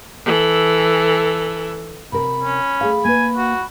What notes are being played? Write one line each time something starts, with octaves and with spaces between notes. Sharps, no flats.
E3 A4
C3 A#4 B5
C#4
A3 G#4 F5
A#3 B4 G#5
F#4